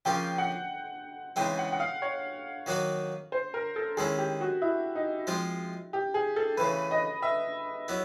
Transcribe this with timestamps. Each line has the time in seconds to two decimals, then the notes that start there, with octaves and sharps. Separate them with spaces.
0.05 C#3 F3 A#3 C#4 F4 G5
0.38 F#5
1.36 C#3 E3 G#3 C4 D#4 G5
1.58 F#5
1.72 F#5
1.80 F5
2.02 C#5
2.66 D#3 F#3 A#3 D#4 F#4
3.32 C5
3.54 A#4
3.76 A4
3.97 D#3 G#3 C#4 E4 G#4
4.18 G4
4.41 F#4
4.62 E4
4.95 D#4
5.27 F3 G#3 C4 F4
5.93 G4
6.14 G#4
6.36 A4
6.57 C#3 E3 A3 B4
6.91 D#5
7.22 E5
7.88 F#3 B3 E4